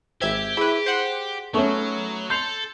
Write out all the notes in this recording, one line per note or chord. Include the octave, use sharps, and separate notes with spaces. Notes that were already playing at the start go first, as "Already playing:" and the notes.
G#1 G4 C5 E5 G#6
E4 G#4 B4 G5
C5 F#5
F#3 A3 B3 C#4 D#4 A4 C#6
A4 C6 G6 C7 F7